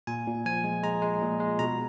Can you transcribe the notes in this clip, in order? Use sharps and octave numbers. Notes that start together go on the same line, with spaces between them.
A#2 G#5
A#2
F3 G#5
G#3
G#3 A#5
G#3
A#2
G#3
B2 A#5